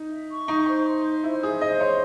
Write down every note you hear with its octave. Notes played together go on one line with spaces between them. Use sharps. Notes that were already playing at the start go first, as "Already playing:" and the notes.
Already playing: D#4
E5
C#6
D#4 E5
C5
C6
E5
E4 C5
G#4 E5
C5 D#5
C#5 C6